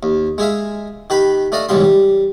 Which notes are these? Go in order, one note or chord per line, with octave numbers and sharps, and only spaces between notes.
D#2
G#3 G#4 E5 F5
D#3 G4 B4 G5 B5
A3 D4 D5 D#5 F5
B1 E2 G#2 C#3 G3 C6
G3